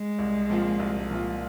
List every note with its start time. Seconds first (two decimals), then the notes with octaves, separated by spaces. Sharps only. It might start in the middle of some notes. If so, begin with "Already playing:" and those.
Already playing: G#3
0.18 C2
0.50 A#2 F3 C4 F4
0.79 C2
1.11 A#2 F3 C4 F4